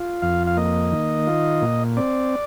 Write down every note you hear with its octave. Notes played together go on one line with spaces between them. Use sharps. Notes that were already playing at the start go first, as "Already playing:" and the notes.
Already playing: F4
F2 F5
F5
A#3 D#5
D#3
F4
A#2
C4 D5